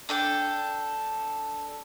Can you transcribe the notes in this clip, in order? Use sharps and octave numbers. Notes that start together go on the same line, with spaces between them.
D4 A4 G5